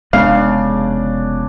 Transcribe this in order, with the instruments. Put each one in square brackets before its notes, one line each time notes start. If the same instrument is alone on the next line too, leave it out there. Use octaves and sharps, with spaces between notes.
[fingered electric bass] F1 G#3 B3 [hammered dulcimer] C#3 D4 [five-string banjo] F5